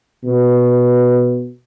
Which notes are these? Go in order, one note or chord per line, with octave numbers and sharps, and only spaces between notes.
B2